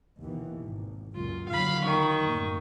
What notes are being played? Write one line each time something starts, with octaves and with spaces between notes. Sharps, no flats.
D#2 B2 E3
G#1
C#2 F#2 A#2 F4
D#2 D3 F#3 F5 B5
D#3 C#6
F#2 A2 A#3